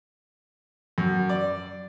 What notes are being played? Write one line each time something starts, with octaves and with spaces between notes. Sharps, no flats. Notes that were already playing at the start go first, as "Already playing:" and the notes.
F#2
D5